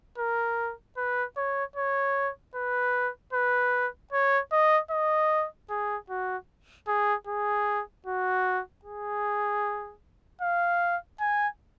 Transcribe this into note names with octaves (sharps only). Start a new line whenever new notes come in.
A#4
B4
C#5
C#5
B4
B4
C#5
D#5
D#5
G#4
F#4
G#4
G#4
F#4
G#4
F5
G#5